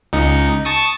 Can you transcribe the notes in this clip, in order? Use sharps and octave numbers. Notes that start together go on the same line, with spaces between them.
C#2 D#4 C#7
A5 C#6 D#6